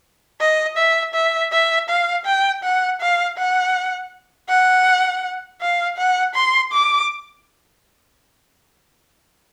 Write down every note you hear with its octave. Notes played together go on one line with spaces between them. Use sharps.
D#5
E5
E5
E5
F5
G5
F#5
F5
F#5
F#5
F5
F#5
C6
D6